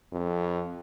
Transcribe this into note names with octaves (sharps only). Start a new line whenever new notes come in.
F2